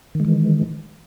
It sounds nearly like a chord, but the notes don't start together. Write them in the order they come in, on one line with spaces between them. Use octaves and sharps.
D#3 G#3 E3